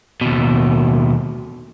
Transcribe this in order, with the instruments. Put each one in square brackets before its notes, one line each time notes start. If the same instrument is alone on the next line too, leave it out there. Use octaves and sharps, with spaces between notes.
[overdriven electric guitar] D#2 B2